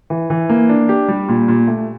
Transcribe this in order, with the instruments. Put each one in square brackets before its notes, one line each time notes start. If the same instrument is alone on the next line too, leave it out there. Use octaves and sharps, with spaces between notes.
[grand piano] E3
E3
A#3
D4
G4
G3
A#2
A#2
A3